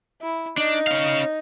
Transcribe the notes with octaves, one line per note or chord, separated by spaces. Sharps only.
E4
D4 D#4
C#4 F5